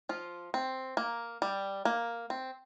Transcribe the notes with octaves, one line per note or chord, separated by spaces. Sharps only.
F3 F4
C4
A#3
G3
A#3
C4